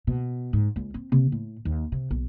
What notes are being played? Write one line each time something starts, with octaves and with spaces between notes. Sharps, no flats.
B2
G#2
C#2
C4
C3
A2
D#2
C3
B1